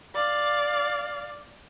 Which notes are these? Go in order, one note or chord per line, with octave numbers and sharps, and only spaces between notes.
D5 F5